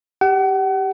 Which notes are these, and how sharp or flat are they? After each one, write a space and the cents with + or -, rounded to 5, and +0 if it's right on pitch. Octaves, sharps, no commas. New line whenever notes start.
G4 +0 F#5 +40